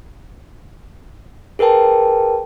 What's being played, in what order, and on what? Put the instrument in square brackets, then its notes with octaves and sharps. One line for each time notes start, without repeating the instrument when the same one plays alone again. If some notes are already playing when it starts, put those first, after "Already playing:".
[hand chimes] G#4 A#4 B4 G5 A5